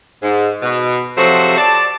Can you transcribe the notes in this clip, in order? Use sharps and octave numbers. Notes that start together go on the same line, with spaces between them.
G#2
B2
C3 F3 F#3 A3 F#4 C5
D5 A5